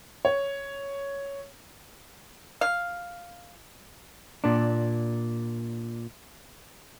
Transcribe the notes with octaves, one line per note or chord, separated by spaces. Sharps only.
C#5
F5
A#2 D4